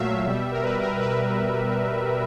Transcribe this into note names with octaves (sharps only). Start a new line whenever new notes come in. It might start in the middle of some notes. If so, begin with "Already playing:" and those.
Already playing: A#2 F#3 A3 E5 F5
B2 G3
A#4
B4
A#4
B4